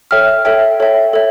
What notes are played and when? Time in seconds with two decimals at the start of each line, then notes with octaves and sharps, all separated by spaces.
0.11 A4 C#5 E5 G5 F6
0.45 A4 C#5 E5 G5
0.80 A4 C#5 E5 G5
1.13 A4 C#5 E5